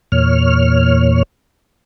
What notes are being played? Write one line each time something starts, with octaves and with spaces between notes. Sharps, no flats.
E2 A#2 C#5 F6